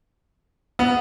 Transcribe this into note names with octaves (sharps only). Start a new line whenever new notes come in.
B3